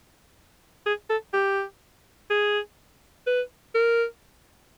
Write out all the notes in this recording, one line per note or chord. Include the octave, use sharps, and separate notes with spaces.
G#4
A4
G4
G#4
B4
A#4